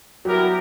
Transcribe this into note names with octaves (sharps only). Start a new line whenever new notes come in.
F#3 G3 B3 E4 G4 A#4